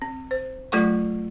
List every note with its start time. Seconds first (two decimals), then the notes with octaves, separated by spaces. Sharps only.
0.02 C4
0.31 C5
0.72 F#3 A3 F4 A4 F#5 C#6